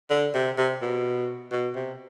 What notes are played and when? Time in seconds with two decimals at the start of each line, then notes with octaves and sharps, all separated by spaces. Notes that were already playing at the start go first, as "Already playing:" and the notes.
0.10 D3
0.34 C3
0.58 C3
0.82 B2
1.51 B2
1.75 C3